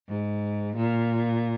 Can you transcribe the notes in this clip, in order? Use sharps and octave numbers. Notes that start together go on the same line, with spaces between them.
G#2
A#2